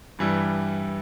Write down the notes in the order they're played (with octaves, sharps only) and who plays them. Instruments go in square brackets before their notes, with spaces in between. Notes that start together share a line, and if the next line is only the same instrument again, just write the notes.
[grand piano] G2 E3 G3 E4